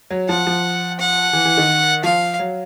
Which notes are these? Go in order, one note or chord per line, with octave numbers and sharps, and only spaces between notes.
F#3
F3 F#5
F3
F#5
E3
E3
D#3
F3 F5
F#3